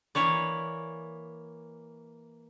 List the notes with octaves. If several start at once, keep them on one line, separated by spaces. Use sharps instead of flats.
E3 A#3 C#5 D5